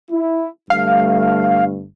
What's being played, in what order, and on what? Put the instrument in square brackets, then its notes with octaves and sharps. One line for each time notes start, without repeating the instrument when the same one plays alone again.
[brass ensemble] E4
[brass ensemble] G1 G2 A3 [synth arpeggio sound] F5